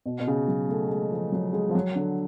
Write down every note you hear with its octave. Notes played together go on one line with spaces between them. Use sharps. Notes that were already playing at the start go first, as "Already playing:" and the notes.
B2
B2
C#3
F#3
A3
G#3
F3
F#3
G#3
F3
F#3
D3